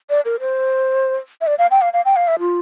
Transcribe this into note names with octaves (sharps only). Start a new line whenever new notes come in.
D5
A#4
C5
E5
D5
F5
G5
F5
F5
G5
F5
E5
F4